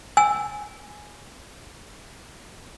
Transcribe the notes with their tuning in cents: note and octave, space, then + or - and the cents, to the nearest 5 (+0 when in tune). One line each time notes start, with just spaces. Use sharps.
G#5 +0 E6 +0